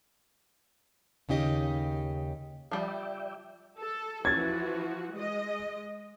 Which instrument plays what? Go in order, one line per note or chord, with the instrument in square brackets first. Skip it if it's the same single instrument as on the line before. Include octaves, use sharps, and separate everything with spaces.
[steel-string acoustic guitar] D#2 C#3 D#4 G4 D#5
[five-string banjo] F3 G3 [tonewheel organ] D5 E5 G5
[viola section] A4
[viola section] E3 F3 F#4 [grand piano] G#6 A6
[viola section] G#3 D#5